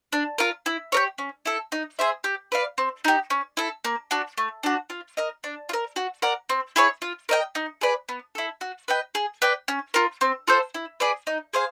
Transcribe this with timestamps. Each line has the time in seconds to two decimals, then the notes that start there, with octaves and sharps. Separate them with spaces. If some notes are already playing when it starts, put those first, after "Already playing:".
0.13 D4
0.38 F4 A#4
0.66 E4
0.92 G4 A#4 C#5
1.18 C#4
1.45 E4 A4
1.72 D#4
1.99 G#4 C5 E5
2.24 G4
2.52 B4 D5 F5
2.78 C4
3.05 D#4 G4
3.30 C#4
3.57 E4 A4
3.84 A#3
4.11 D4 F#4
4.38 A3
4.63 D4 F#4
4.90 F4
5.17 A#4 D#5
5.44 D4
5.69 F4
5.73 A#4
5.96 F#4
6.22 A#4 D5 F#5
6.49 C4
6.76 E4 G#4 C#5
7.02 F4
7.29 A#4 D#5 G5
7.55 D#4
7.81 G#4 B4 D5
8.09 B3
8.35 E4 A4
8.61 F#4
8.88 B4 D#5 G5
9.15 G#4
9.42 B4 D5 G5
9.68 C#4
9.94 F4 A#4
10.21 C4
10.48 F4 A4 C5
10.74 E4
11.00 G#4 B4 D5
11.27 D#4
11.53 G#4 C5 F5